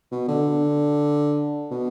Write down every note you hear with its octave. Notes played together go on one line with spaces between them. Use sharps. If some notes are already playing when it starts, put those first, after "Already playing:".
B2
D3
B2